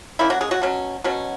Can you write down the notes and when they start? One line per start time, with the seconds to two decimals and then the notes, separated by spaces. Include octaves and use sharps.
0.19 D#3 A#3 C#4 E4
0.30 F#3 F#4
0.41 G#3 G#4
0.51 F#3 F#4
0.62 B2 F#3 C#4
1.04 B2 F#3 C#4